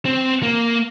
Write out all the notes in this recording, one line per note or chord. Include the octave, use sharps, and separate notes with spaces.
C4
A#3